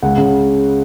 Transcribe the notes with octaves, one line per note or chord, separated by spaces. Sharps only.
C#2 F#5
C#3